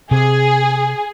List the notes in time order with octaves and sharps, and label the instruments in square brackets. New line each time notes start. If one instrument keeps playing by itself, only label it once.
[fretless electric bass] C3 [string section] G#4